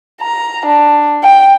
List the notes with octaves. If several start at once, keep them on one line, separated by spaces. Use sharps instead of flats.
A#5
D4
G5